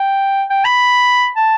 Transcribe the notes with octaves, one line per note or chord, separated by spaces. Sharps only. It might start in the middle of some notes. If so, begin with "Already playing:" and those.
Already playing: G5
G5
B5
A5